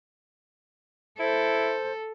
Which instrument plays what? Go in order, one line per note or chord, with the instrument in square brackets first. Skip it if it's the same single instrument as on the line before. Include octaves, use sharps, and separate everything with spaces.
[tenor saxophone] E4 [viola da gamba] A4 [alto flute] C5